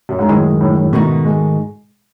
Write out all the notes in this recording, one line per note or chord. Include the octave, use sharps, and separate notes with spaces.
F#2
G#2
F#2 A2 D#3 G#3
A2
A2
G#2 B2 D#3 A3 D#4 F#4
G#3